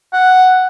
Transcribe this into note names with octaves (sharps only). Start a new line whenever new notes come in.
F#5